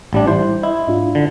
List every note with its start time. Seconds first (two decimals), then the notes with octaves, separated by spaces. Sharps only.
0.13 A1 G3 D4
0.27 G3 E4 C5
0.63 E4 D#5
0.87 G#2 D4 F4
1.15 D3